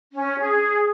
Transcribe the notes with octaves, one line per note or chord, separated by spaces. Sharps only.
C#4
G#4